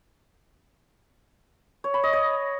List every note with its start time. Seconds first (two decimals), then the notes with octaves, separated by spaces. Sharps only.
1.84 C#5
1.94 B5
2.04 D#5
2.13 C#5